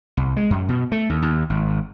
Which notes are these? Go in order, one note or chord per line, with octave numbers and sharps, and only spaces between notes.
C2
G#3
F#2
B2
A3
D#2
D#2
G#1